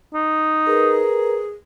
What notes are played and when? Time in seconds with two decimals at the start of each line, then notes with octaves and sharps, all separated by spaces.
0.14 D#4
0.67 G#4 A#4 B4 A#5